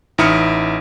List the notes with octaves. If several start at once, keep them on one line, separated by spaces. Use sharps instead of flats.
A1 D#4 E4 D#6 F6 C#7